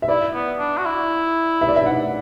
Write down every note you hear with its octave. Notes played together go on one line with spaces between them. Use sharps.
E5
E4 D5
B3
D4
F#4
E4
E5
D5
E5
F#5